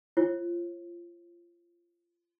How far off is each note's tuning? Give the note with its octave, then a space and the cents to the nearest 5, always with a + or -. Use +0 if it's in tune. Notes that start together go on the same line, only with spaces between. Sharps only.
F4 -25 C#5 -45